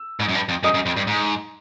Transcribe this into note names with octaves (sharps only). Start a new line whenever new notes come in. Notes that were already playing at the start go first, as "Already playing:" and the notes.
Already playing: E6
G#2
F#2
G2
F2
F#2 D#5 D#6
F#2
F2
G2
G#2